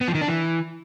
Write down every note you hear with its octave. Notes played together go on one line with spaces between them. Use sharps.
B3
F3
D#3
D4
E3